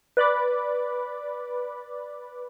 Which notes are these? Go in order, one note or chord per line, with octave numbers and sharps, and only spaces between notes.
B4 D5 B5 D6